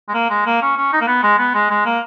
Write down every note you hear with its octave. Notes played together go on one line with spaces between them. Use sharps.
G#3
A#3
G#3
A#3
C#4
C#4
D#4
A#3
B3
G#3
B3
G#3
G#3
A#3